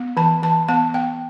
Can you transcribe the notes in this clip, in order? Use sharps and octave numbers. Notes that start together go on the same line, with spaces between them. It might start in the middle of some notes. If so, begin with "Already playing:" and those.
Already playing: B3
E3 A5
E3 A5
B3 A5
B3 G5